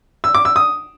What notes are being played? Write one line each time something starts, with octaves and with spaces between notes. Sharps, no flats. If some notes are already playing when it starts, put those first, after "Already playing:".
E6
D6
E6
D#6